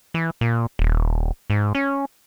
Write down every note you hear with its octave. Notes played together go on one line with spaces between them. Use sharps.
E3
A#2
D#1
G#2
C#4